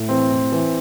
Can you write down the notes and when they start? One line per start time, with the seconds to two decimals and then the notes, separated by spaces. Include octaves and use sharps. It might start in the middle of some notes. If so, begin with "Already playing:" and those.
Already playing: A2
0.09 E3 C4
0.31 A2
0.52 E3